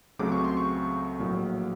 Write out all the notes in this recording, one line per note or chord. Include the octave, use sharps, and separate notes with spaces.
C#2 C#3 F#3 A3 C4 D6
C#6
C6
C#6
A#1 A2 F#3 A#3